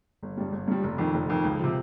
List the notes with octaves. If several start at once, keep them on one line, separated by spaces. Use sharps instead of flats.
G1
G2 G3
G1
G2 G3
F1
F2 D#3
F1
F2 D#3
C#2
C3 F3